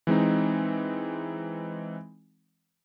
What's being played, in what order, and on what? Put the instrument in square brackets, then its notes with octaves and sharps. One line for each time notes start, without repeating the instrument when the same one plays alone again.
[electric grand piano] E3 G#3 C4 D#4